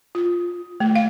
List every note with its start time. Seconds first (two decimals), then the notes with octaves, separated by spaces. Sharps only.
0.15 F4
0.80 A3
0.96 F5